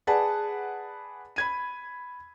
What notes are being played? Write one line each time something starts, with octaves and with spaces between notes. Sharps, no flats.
G#4 B4 D5 F#5 A5
B5 G#6 D#7